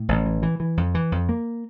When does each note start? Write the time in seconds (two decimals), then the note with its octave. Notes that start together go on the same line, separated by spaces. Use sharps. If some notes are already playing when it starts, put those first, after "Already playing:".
Already playing: A2
0.09 A1
0.26 E3
0.43 E3
0.60 E3
0.77 F2
0.95 E3
1.12 F2
1.29 A#3